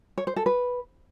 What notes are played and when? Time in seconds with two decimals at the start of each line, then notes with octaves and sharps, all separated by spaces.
0.18 C#5
0.27 C5
0.36 A4
0.46 B4